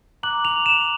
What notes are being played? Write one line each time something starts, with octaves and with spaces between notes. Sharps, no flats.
A#5 D6 F#6 F#7
F7
E7